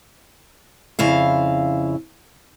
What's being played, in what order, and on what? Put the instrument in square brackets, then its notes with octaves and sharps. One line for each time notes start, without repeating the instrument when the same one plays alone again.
[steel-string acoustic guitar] F2 C#3 E4 F5